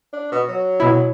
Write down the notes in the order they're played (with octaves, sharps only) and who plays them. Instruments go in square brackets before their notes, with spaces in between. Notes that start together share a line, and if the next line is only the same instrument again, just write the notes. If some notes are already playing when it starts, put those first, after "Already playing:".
[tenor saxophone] D4
B2
F#3
[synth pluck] B2 E4